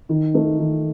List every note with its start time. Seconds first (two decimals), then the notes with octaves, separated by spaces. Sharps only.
0.09 D#3
0.34 A3 D#4 A#4
0.59 D#3